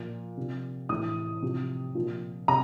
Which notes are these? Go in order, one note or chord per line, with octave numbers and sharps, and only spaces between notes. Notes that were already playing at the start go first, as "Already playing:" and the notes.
Already playing: A#2 F3
C3 F3
A2 E3 D#6
C3 F3
A#2 F3
C3 A#5